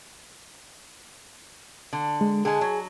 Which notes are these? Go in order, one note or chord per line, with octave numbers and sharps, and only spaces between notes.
D3
G#3
D3 G#3 G#4 G#5
F#3